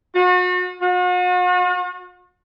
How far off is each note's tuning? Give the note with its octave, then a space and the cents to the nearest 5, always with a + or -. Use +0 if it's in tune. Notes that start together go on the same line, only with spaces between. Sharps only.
F#4 -40
F#4 -45